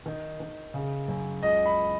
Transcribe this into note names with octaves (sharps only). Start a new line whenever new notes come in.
D#3
D#3
C#3
F#2
C#2 D#5
B5